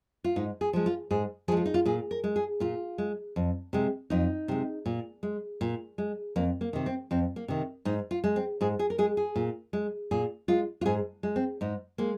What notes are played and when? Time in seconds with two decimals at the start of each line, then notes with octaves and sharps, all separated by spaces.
0.24 F4
0.36 G#2 D#4
0.61 G#4
0.73 F3 G#3
0.86 F4
1.11 G#2 G#4
1.48 F3 G#4
1.52 G#3
1.57 F4
1.66 D#4
1.74 F4
1.85 A#2 G#4
2.11 A#4
2.24 G#3
2.36 G#4
2.60 A#2 F4
2.98 G#3
3.36 F2
3.73 C3 G#3
4.10 F2 D#4
4.48 C3 G#3
4.86 A#2
5.23 G#3
5.61 A#2
5.98 G#3
6.36 F2 A#3
6.61 A#3
6.73 C3 D#3
6.86 C4
7.11 F2 C4
7.36 A#3
7.48 C3 D#3
7.85 G#2 D#4
8.11 F4
8.24 G#3
8.36 C4
8.61 G#2 G#4
8.79 G#4
8.90 A#4
8.98 G#3 G#4
9.17 G#4
9.36 A#2
9.73 G#3
10.11 A#2 G#4
10.48 G#3 F4
10.81 F4
10.86 G#2 G#4
11.23 G#3
11.36 C4
11.61 G#2 D#4
11.98 G#3 A#3